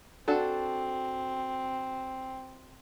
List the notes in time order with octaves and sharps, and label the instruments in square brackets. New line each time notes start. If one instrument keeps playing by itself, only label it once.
[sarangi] C4 [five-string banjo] D4 F#4 A4